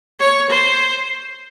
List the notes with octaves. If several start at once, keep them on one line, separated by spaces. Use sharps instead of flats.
C#5
C5